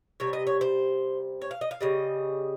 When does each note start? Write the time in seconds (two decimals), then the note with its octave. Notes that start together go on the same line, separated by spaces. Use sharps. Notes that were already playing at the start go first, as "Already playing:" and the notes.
0.20 C3 G3 C#5
0.33 D#5
0.47 C#5
0.61 C5
1.42 C#5
1.51 F5
1.61 D#5
1.71 F5
1.81 C#3 G3 D#5